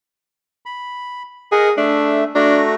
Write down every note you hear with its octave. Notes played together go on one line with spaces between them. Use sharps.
B5
G#4 A#4 D#5 F#5
A3 D4 E5
A3 D4 F#4 A#5